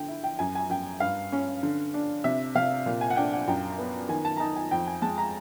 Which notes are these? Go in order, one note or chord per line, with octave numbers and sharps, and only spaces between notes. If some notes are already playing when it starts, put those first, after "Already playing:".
Already playing: D3 G5
E4
G5
F#2 G#5
G#5
F#2 G5
G2 F5
C#4
D3
D4
C3 E5
C3 F5
A#2
G#5
F#5
D4 G5
F#5
F#2 G5
B3
D#3 G#5
A5
A#5
D#4 A5
G#5
F2 G5
G#5
G#3 A5
A#5